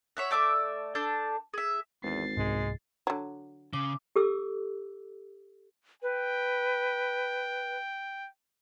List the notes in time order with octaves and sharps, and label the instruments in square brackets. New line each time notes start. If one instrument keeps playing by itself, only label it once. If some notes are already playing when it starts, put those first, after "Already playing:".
[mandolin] C#5 E5 F#5
A3 D5 E5 D6
D4 A4 A5 G6
G#4 E5
[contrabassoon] G#1 [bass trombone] E2 [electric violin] A6 C7
[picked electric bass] C2 G#2 [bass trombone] G#3
[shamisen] D3 F#3
[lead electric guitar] C#3 [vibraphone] D6
[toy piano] G4 A4 D6 E6
[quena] B4 [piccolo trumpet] G5